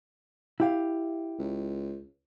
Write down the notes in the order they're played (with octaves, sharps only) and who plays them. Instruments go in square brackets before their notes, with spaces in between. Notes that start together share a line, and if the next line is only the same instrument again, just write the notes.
[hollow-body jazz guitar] E4 G4 F5
[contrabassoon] C#2